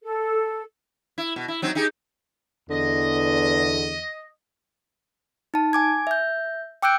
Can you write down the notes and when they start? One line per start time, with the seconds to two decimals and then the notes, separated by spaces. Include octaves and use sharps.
0.03 A4
1.18 E4
1.36 B2
1.48 E4
1.62 F#3 C4 D#4
1.75 D#4 G4 G#4
2.70 E2 D3 D#5
5.54 D#4 A5
5.73 G#5 D6 G#6
6.07 E5 G6
6.82 G5 D6 E6 F#6 G6 D7